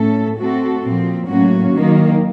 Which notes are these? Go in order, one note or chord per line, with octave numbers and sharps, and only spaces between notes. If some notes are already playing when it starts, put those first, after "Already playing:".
Already playing: A2 A3 C#4 A4
A3 C4 F#4 A4
A#2 F3 C4
A2 F#3 A#3 C#4 F#4
D#3 F#3 A#3